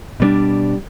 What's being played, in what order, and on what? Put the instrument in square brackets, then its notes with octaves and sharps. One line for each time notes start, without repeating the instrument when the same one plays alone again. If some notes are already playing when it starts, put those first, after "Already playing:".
[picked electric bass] B2 G3 B3 D4